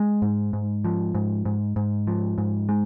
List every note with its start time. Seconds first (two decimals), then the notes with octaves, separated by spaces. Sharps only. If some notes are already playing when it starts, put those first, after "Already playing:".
Already playing: G#3
0.22 G#2
0.53 G#2
0.85 F3
1.15 G#2
1.45 G#2
1.76 G#2
2.07 F3
2.38 G#2
2.69 G#3